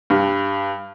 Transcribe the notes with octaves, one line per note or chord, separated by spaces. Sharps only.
G2